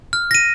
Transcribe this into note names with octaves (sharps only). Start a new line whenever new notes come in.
F6
A#6 D#7